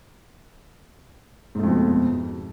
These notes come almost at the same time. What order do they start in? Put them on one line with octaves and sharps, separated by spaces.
G#2 A3 F2 B2